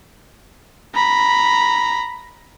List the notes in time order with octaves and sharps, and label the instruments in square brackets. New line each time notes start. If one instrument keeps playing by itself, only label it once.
[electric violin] A#5 B5